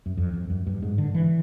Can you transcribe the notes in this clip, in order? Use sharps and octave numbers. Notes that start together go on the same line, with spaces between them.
F#2
F2
F2
F#2
G2
G#2
D3
E3